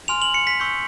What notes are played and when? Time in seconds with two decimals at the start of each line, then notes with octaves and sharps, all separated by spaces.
0.08 G#5 C6 F6 F7
0.22 F#7
0.34 C#7
0.47 B6
0.60 C#6 E6 G6